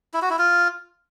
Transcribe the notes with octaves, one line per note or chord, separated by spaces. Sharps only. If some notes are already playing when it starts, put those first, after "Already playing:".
E4
F#4
E4
F4